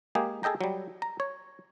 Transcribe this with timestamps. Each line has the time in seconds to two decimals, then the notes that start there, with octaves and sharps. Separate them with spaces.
0.15 G#3 A#3 G4 G#4
0.43 G#4 A4 D#5 G5 A#5
0.61 F#3 G3
1.02 A#5
1.20 C#5